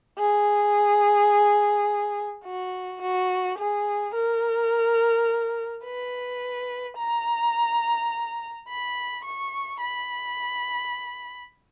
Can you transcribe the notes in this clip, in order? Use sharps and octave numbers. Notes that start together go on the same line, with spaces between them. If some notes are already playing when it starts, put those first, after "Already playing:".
G#4
F#4
F#4
G#4
A#4
B4
A#5
B5
C#6
B5